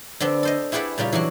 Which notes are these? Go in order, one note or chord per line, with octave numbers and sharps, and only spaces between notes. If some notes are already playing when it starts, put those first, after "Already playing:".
D3 B3 C4 D4
A4 C5 D#5
E4 G4 G#4 B4 D5 F#5
A#2 C#3 G3 F4
E3 F#3 D4 F#4